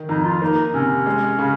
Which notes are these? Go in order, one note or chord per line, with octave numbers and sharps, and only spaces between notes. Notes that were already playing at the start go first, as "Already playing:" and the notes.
Already playing: D#3
F2 D#4
F4
A#3 D#4
C3 C#4
G#3
C#3